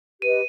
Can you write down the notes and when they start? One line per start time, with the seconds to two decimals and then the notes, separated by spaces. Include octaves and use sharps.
0.22 G4 B4 D#5 D#7